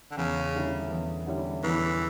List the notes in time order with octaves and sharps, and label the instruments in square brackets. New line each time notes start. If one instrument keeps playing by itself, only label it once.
[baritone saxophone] D3
[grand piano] E2 [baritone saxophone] C#3
[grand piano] D3 G3 C#4 E4
E2
D3 G3 C#4 E4
[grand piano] E2 [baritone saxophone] E3